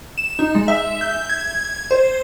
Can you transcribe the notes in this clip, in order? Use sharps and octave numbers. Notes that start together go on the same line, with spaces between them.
E7
D#4
G#3
E5
G6
G#6
C5